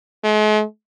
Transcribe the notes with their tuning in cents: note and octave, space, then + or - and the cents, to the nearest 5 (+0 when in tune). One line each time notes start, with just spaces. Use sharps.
G#3 +45